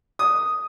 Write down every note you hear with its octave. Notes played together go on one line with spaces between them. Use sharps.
D#6